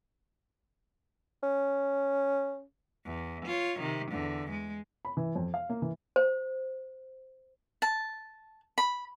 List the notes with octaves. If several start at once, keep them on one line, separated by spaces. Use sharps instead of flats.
C#4
E2
F4 C#5
C3 D#3
E2 D3
G#3
B5
E3
F2
F5
A#3
E3
C5
A5
B5